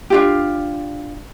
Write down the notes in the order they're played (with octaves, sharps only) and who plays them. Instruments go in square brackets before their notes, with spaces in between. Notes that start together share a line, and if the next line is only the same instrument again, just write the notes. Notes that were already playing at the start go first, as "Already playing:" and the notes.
[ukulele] D4 F4 G4